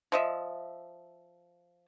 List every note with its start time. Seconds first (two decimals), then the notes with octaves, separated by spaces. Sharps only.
0.12 F3 D#5 E5